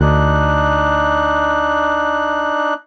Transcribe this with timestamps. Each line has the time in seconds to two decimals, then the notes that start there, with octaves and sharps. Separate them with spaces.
0.01 D2 D4 D#4 F#6